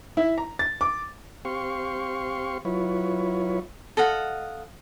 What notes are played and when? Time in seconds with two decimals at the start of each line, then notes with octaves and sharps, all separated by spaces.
0.17 E4
0.38 A#5
0.59 A6
0.81 D6
1.45 C4 G4 F5 C6 C#6
2.65 F#3 E4 F4 B4 C#5
3.97 A4 D#5 F5 F#5